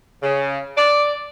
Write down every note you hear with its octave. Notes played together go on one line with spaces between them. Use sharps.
C#3
D5